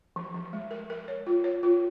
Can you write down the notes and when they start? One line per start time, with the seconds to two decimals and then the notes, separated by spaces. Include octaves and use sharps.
0.16 F3
0.35 F3
0.53 G#3
0.71 A#4
0.90 A#4
1.08 C#5
1.27 F4
1.44 C#5
1.63 F4